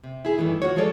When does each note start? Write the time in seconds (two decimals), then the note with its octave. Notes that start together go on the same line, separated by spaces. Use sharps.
0.04 C3
0.25 E4 G#4
0.38 G2 D#3 E3 A3
0.62 F4 F#4 C#5
0.76 F3 G#3 G#4 A4 C#5 D5